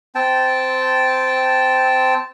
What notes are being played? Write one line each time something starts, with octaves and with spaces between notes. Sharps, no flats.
C4 G5 A5